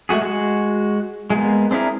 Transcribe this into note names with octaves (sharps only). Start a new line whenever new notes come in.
G#3 A3 F#4 G#4
G#3 F#4
G#3 A#3 B3
C4 D4 E4 G#4 A#4